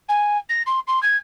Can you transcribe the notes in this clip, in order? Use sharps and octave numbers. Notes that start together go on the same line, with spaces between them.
G#5
A#6
C6
C6
G#6